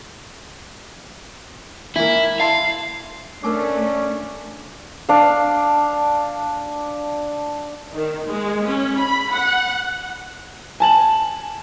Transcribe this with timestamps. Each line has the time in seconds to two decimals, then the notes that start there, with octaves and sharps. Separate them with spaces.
1.96 E3 A#3 E4
2.40 E4 F5 A5 C6
3.43 A3 C#4 D4 A#4 A5 D6
5.09 D4 F5
7.93 D#3
8.28 G#3
8.66 C#4
8.99 B5
9.33 F#5
10.80 G#5 A5 F#7